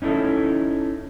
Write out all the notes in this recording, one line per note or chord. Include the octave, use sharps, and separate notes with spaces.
C#4 D#4 E4 A4